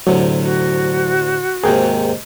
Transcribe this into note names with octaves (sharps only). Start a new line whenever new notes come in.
D2 A2 C3 F#3
F#4
D#2 G#2 C3 G#4 A#4 G5